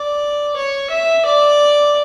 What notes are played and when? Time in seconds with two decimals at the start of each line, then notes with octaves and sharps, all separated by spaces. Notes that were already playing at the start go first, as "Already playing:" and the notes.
Already playing: D5
0.56 C#5
0.90 E5
1.25 D5